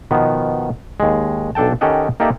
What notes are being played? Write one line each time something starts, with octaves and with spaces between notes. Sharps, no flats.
B2 D#3 F3 B3
D#2 G#3
B1 D4 A4 G5 A5
D#3 C#4 G4 A4 D#5 F#5
A#3 D#4 G4 A4 D5 E5